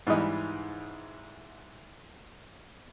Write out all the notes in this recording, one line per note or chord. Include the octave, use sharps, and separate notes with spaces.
G#2 E3 G3 D#4 E4